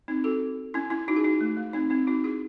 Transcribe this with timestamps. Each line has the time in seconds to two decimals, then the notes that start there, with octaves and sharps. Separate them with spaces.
0.08 C4 D#4
0.24 F#4 A4
0.74 C#4 E4
0.90 C#4 E4
1.08 D#4 F#4
1.16 G#4
1.24 D#4 F#4
1.41 A3
1.57 A3
1.73 C4 D#4
1.90 C4 D#4
2.07 D#4 F#4
2.24 E4 G#4